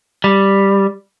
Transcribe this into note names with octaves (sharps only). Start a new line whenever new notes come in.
G3